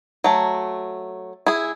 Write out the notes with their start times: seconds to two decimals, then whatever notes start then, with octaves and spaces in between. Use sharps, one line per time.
0.24 F#3 A3
1.47 E4 G#4